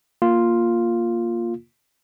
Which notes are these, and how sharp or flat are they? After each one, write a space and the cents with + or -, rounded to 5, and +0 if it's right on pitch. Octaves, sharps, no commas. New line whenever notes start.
A#3 +0 F4 +0